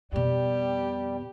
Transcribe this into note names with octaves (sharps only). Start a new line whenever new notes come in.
F2 B2 G3 G4